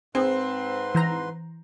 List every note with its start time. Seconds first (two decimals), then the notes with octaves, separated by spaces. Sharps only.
0.15 G#2 C4 G#4 B4 C6
0.95 E3 C5 A#5